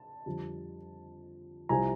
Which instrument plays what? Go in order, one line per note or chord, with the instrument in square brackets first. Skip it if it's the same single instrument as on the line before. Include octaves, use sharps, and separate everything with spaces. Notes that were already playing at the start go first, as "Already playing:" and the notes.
Already playing: [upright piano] A5
F2 D3 G3
C2 C3 F3 G#5 A#5